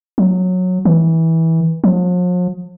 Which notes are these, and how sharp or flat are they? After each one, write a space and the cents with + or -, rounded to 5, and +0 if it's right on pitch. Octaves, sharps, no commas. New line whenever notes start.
F#3 -15
E3 -20
F3 +45